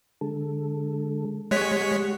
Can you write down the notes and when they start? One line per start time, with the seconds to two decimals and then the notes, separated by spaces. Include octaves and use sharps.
0.21 D3 G#3 A4
1.51 G#3 G4 C#5 F#5 B6